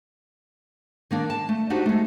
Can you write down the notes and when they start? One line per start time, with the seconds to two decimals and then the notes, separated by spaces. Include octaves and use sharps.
1.11 D#3 A#3 D4
1.30 A5
1.49 A3
1.70 D4 D#4 F#4 G4 C5
1.86 G#3 A3